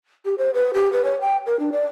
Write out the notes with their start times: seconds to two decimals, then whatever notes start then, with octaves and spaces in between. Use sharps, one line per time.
0.25 G4
0.38 C5
0.54 B4
0.74 G4
0.92 B4
1.04 C#5
1.21 G5
1.46 A#4
1.59 D4
1.72 D5